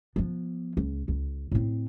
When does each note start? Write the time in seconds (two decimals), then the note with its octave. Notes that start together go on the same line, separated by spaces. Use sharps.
0.16 F3 B3
0.77 C#2
1.08 C#2
1.51 A2 C4